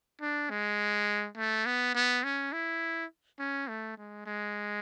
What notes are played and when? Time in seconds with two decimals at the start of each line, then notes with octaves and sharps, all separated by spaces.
0.21 D4
0.50 G#3
1.37 A3
1.66 B3
1.95 B3
2.24 C#4
2.53 E4
3.39 C#4
3.68 A3
3.97 G#3
4.26 G#3